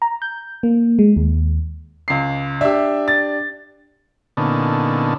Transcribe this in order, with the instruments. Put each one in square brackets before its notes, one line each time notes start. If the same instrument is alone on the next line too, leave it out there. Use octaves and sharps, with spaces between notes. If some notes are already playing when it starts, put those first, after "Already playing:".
[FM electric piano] A#5
G6
A#3
G#3
D#2
[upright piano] C#2 C7
[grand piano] D4 G4 [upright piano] E5 E6
[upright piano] A6
[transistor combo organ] A#2 D3 B3 C#4 D#4 A4